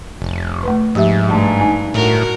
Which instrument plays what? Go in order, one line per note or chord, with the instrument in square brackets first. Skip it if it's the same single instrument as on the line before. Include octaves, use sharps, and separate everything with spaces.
[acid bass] F1
[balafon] A3 B4
[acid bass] G#2 [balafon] F3 G4 E5
[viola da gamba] G2 [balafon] A3 A5
[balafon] D4 D#4 G#5
[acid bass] A2 [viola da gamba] F#4 A#4